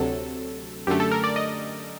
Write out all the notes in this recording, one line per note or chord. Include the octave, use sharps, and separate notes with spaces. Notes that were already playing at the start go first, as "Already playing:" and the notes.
Already playing: D2 C3 F#3 A4
F#2 D3 A3 G4
A4
A#4
D5
D#5